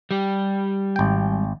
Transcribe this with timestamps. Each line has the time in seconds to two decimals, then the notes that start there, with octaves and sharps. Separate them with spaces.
0.11 G3 G4
0.96 G#1 G5